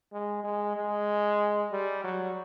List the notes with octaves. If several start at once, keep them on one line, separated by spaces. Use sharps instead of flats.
G#3
G#3
G#3
G3
F#3